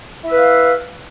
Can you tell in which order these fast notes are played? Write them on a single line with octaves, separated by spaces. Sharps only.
E4 E5 B4 F5